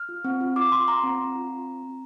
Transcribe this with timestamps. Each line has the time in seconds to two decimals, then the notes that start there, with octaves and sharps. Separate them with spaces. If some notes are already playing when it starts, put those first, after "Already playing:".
Already playing: F6
0.09 F4
0.24 C4
0.41 F4
0.56 F4 D6
0.72 F4 C6
0.88 F4 A#5
1.04 C4
1.19 C4
1.35 F4
1.51 C4
1.67 C4
1.83 C4